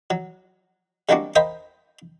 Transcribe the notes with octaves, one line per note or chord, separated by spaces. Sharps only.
F#3
G3 G#3 A#3 C4 D4 F#4
A#4 C5 D#5 F5 G5 B5